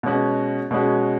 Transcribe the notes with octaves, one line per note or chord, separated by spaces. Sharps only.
B2 G#3 C#4 F#4
B2 G#3 C#4 F#4